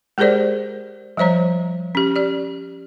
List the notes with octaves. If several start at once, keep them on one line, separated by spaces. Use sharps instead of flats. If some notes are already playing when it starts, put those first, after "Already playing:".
G#3 G4 G#4 A#4 C5 D5
F3 G3 C5 C#5 A#5
C#4 G4
G4 D5